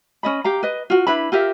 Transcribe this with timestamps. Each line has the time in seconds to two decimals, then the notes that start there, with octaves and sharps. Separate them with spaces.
0.23 C#4 D#5 B5
0.44 G4 F5 A#5
0.63 B4 D#5
0.90 F4 F#4
1.07 D4 E4 B4 B5
1.32 F4 G4 A#4 E5